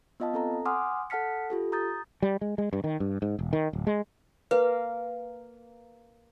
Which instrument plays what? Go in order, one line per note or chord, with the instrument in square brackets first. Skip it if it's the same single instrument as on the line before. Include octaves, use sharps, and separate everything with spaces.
[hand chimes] B3 F4 D#5 F5 A5
C4 A4 A#5
F#5 G#5 C6 D6 D#6 F6
A4 F#5 A5 F6 B6 C#7
F4 G4 A4
A#5 D#6 G6 A6
[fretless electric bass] G3
G#3
G#3
G2
D#3
G2
G#2
E1
D#3
D1
G#3
[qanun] A#3 [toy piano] B4